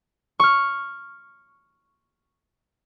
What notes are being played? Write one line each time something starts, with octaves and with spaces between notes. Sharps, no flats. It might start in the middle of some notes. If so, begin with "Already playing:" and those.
C#6 F6